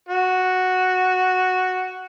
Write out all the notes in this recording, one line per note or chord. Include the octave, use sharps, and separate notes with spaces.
F#4